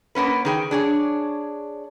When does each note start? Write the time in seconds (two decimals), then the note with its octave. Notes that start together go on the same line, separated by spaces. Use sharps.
0.15 A#3 B3 C#4 B4
0.45 D#3 G#4 G5
0.71 D4 G#4 C#5